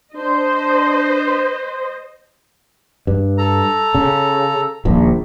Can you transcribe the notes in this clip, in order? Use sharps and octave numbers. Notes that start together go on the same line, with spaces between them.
D4 C5 D#5
G2
A4 A#5
C#3
D#1 A#1 A#2